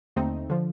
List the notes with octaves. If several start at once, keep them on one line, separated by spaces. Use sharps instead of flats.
D#2 D3 A3 C4 D#4
D3 F3